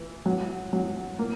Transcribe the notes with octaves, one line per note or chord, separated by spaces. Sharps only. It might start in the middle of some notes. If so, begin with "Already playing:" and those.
Already playing: E3
F#3
F#3
A#3